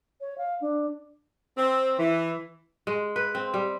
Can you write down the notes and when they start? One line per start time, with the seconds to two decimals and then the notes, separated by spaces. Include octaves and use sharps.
0.21 C#5
0.38 F5
0.61 D4
1.58 C4
1.99 E3
2.87 G#3
3.16 B4
3.35 C4
3.54 G3